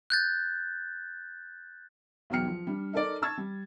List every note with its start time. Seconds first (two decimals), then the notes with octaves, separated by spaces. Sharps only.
0.10 F#6 G6 A6
2.30 B1 E2 F#3 G5 F6 C#7
2.47 F3
2.67 G3 D4
2.93 D#4 A4 A#4 D5
3.22 A5 C#6 E6 G#6 A6
3.38 G3